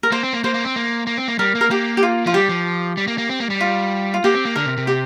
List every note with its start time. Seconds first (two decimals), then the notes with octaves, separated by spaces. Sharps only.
0.03 A#4
0.12 A#3 C5
0.23 C4
0.33 A#3
0.44 A#3 C5
0.54 A#3
0.65 C4
0.76 A#3
1.07 A#3
1.18 C4
1.28 A#3
1.39 G3 A#4
1.55 A#3
1.61 A#4
1.70 A#3 G4
1.97 G4
2.03 F4
2.26 F3 F4
2.33 G3 G4
2.49 F3
2.97 G3
3.08 A#3
3.18 A#3
3.29 C4
3.40 A#3
3.50 G3
3.61 F4
4.14 F4
4.24 A#3 G4
4.35 C4
4.45 A#3
4.56 D3 A#4
4.66 C3
4.77 C3
4.87 G4